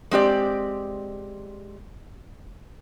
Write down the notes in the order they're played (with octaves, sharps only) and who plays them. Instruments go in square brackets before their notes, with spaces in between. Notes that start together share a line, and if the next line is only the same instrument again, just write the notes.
[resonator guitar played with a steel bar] G#3 C4 G4 D5